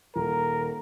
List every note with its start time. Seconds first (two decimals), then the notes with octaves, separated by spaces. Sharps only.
0.15 D#1 A#4